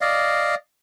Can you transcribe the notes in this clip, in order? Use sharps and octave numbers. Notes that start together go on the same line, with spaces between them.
D5 D#5 F5